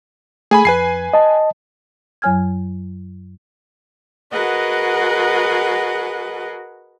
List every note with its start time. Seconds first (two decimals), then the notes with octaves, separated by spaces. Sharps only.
0.51 A3 G#4 G#5 B5
0.65 F2 B4 G#5 C7
1.13 D#5 A5
2.22 F#2 F#3 C#5 G#5 F6 G#6
4.32 F#4 G#4 A#4 B4 D#5 F#5